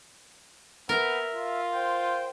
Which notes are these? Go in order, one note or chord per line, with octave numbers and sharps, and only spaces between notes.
B3 A#4 E5
F4
C5 G5